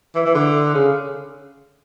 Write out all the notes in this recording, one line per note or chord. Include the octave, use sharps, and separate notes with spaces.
E3
E3
D3
C#3